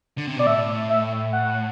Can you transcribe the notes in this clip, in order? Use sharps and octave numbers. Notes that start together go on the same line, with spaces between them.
D3
C3
B2 D5
A2 E5
E5
F#5